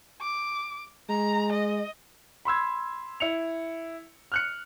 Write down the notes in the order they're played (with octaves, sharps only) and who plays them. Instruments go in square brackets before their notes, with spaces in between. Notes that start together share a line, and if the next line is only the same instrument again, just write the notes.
[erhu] D6
[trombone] G#3 [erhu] A#5
[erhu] D#5
[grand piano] B5 C6 E6 G#6
E4 C#7 F7
F6 F#6 C#7